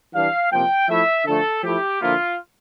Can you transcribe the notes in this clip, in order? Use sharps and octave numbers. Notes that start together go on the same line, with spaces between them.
E3 G3 D4 F5
C3 F3 A#3 G5
F3 A3 E4 E5
D3 F3 A3 A4
F3 A3 E4 G4
D3 F3 A#3 E4 F4